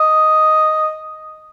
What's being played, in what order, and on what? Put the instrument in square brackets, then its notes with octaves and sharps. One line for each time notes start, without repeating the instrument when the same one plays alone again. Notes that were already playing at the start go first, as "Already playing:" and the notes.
Already playing: [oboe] D#5